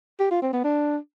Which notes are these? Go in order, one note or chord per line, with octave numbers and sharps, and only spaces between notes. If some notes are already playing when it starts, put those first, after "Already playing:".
G4
F4
C4
B3
D4